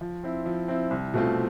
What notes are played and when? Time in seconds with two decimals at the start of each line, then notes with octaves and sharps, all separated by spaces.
0.01 F3
0.24 C4 E4
0.46 F3
0.68 C4 E4
0.91 C2
1.14 B2 A3 C4 F4